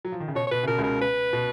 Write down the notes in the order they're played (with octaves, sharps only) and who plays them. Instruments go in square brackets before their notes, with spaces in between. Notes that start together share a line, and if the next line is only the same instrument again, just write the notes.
[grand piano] F#3
F3
D#3
C#3
[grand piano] B2 [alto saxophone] C#5
[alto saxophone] C#5
[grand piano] B2 [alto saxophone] B4
[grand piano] C#3
[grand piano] B2 [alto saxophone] A#4
[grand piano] C#2 C#3
[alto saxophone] A#4
B4
[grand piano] B2